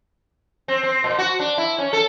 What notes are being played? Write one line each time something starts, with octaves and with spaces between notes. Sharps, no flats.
C4
C4
A#2
F#4
D4
E4
C#4
A4